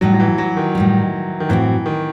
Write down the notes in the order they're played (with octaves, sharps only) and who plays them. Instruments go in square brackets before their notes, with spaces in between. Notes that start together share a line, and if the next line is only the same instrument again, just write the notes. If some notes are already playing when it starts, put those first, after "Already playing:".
[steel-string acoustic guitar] A2 G3 D#4 [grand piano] F#3
[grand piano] F#3
E3
F#3
D#3
[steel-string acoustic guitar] A2 G3 D#4
[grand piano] D#3
[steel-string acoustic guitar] A2 F#3 C4 F#4 [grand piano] E3
[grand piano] D#3